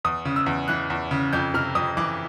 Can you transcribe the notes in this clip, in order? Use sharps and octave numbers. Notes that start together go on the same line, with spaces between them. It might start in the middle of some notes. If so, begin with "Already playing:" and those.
E2 D#6
C#3
E6
E2
E3 F#6
E2
C#3
F2 G6
C3 F6
F2 D#6
E3 D6